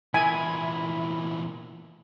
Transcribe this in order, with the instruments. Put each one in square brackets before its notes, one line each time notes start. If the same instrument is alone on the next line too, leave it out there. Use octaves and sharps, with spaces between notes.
[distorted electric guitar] E2 A#2 [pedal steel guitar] E4 [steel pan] G#5